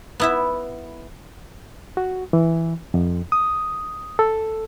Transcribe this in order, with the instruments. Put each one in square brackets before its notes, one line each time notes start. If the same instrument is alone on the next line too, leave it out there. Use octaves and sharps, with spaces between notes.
[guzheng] B3 E4 E5
[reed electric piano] F#4
E3
F2
D#6
A4